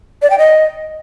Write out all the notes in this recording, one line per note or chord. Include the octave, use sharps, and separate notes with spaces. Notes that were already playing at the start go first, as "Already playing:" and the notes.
D5
G5
D#5